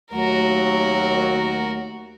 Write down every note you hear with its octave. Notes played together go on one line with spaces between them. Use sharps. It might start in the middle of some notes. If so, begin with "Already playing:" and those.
D#2 F#3 A3 F#4 A#4